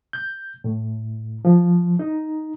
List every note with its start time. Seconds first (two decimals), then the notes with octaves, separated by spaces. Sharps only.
0.13 G6
0.64 A2
1.45 F3
1.99 D#4